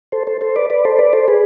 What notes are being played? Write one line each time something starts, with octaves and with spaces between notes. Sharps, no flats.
A4 C5
A4 C5
A4 C5
B4 D5
B4 D5
A4 C5
B4 D5
A4 C5
G#4 B4